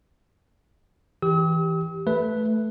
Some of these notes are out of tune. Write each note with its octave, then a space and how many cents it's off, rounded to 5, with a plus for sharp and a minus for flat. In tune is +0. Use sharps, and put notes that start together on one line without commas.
E3 -10 G4 +0 E6 -45
A3 +0 B4 +0